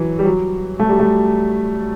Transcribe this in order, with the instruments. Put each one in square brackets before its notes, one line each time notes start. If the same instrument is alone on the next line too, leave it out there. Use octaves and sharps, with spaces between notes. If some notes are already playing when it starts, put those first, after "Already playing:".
Already playing: [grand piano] E3 F#3
G3
F#3
A3
G3
A3